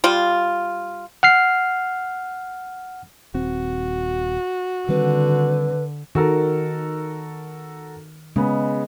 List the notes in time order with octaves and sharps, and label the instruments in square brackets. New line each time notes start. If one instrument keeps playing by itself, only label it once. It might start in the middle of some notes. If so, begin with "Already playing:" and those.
[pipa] G3 F4
[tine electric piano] F#5 F6 C7
[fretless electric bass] D#1 C4 [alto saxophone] F#4
[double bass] D3 [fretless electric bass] D#3 G3 C4 [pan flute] B4
[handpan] D#3 [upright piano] F#4 A4 A#4
[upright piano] C#3 B3 [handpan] G#3